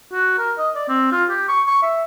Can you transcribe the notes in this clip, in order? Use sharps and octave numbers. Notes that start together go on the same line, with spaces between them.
F#4
A#4
D#5
D5
C4
F4
G4
C#6
C#6
E5